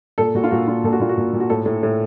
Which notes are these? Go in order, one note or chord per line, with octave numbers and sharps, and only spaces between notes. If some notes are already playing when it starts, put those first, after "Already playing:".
A#2 A4
A#2 F#4
F4
A#2 F#4
A#2 F4
A#2 A4
F#4
A#2 F4
F#4
A#2
A#2
F#4
A2 A4
A2
A2